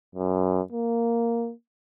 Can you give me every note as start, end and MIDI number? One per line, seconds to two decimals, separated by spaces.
0.15 0.61 42
0.72 1.52 58